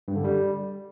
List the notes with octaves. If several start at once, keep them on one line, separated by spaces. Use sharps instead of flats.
G2
D3
G3